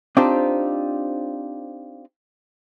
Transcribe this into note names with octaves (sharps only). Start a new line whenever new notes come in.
C4 D4 D#4 F4 G4 C5